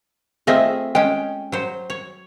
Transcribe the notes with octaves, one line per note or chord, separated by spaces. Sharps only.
A3 C4 F4 G#4 D#5 E5
G#3 C#4 G5
F#3 C5
C#5